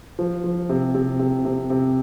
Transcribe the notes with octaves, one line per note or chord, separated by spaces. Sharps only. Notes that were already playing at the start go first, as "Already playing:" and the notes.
F3
F3
C3
C3
C3
C3
C3